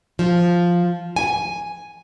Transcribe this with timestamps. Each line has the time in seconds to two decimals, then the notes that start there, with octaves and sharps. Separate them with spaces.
0.19 F3
1.16 G#5